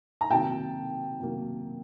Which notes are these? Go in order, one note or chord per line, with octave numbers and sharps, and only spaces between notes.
A#5
C3 D#3 F#3 A#3 G5 A5
C3 D#3 F#3 A#3